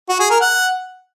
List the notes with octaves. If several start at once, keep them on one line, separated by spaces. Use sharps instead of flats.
F#4
G#4
A#4
F#5